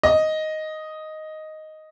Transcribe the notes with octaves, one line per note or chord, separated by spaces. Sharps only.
D#5